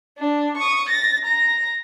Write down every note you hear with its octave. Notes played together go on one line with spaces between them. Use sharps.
D4
C#6 D#6
A6 A#6
A#5 A#6